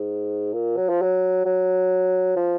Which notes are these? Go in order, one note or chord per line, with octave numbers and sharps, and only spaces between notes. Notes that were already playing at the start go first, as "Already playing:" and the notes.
Already playing: G#2
A#2
F#3
F3
F#3
F#3
F3